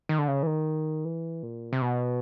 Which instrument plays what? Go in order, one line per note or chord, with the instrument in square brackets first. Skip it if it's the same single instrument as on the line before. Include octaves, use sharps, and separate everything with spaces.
[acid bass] D#3
D3
C#3
E3
D#3
E3
A#2
C3
B2